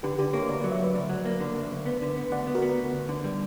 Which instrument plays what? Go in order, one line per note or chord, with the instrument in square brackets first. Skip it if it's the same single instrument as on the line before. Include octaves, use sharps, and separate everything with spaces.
[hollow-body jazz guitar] D3 [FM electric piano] G4 B4
[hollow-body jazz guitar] D3 [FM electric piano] G4 B4
[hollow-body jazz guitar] A#3 [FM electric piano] A#4 C#5
[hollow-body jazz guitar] D2 [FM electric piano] B4 D5
[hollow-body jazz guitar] F#3 [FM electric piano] B4 D5
[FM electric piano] C#5 E5
[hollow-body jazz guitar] D2 [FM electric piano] B4 D5
[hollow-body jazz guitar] D2 [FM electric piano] B4 D5
[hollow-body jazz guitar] F#3
A#3
D3
D2
D2
B3
D3
B3
[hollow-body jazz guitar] D2 [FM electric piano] D5 F#5
[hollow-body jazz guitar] B3
[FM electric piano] F#4 A#4
[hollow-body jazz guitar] B3
D2
D2
D3
G3